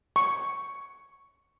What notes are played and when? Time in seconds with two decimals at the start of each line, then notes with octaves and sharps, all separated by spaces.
0.16 C#6